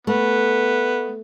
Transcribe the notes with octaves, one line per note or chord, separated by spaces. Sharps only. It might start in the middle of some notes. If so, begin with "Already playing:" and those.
A3 B3